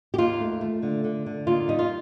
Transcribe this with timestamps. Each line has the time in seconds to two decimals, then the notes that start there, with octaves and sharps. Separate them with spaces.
0.14 G4
0.18 D#2 F4
0.40 A3
0.61 A3
0.83 D3
1.04 D3
1.26 D3
1.47 D#2 F4
1.68 G3 D#4
1.79 F4